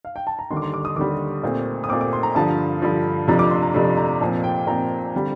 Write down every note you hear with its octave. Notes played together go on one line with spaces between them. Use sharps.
F5
G5
A5
A#5
D#2 D3 G3 C6
D6
C6
D6
D#6
D#2 D3 G3 D6
A#2 A3 C4
D#6
A#2 A3 C4 D6
D6
C6
A#5
G2 D3 F3 A5
G2 D3 F3
F2 C3 F3 A3 D4 A#5
D6
C6
A#5
F2 C3 F3 A3 D4
A#5
A#2 F3 C4 A5
G5
A#2 F3 C4 A#5
D3 G3 C4